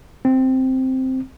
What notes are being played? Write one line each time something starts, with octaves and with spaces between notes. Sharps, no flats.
C4